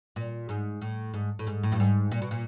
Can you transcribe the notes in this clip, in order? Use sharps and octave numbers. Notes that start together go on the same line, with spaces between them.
A#2
G#2
A2
G#2
A2
G#2
A2
G2
G#2
A#2
B2
A#2